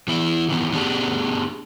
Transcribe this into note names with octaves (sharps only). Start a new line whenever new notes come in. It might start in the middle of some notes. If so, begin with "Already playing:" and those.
E3 B3 E4
D#3 E3 B3
B3 C#4 D4 G4 G#4